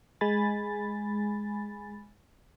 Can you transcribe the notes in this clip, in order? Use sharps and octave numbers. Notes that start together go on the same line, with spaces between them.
G#3 G#5 B5 A6